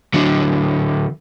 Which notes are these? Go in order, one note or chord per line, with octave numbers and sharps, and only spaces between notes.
D3 F#3